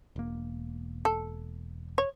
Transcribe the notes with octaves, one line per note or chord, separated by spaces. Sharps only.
E1 A#3
A4
C#5